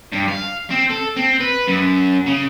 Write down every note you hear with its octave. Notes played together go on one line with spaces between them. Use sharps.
G2
F5
C4
A4
C4
B4
F#2
C#3